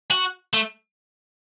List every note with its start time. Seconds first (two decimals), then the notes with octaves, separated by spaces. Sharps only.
0.11 F#4
0.53 A3